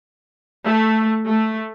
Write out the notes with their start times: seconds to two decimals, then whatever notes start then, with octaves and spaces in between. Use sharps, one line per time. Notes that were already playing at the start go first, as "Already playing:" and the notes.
0.66 A3
1.27 A3